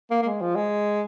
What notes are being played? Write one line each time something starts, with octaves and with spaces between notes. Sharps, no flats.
A#3
A#3
G#3
F3
G#3